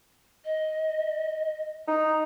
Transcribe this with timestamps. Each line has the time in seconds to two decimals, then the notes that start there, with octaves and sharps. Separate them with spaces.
0.45 D#5
1.87 D#4 A#5